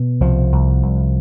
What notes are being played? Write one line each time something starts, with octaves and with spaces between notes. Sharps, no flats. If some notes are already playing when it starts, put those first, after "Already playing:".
Already playing: B2
C2 F3
C2
C2